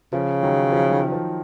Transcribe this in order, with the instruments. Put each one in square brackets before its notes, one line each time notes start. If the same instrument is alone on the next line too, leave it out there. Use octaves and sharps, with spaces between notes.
[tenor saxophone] C#3 [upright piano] F3
[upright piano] D#3 F#3
F3
D#3
F3